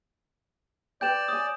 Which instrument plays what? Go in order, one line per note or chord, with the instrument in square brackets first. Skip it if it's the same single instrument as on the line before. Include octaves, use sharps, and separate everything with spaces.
[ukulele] B4 G5 [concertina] D5 [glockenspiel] G6 E7
[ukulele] C#5 G#5 [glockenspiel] D#6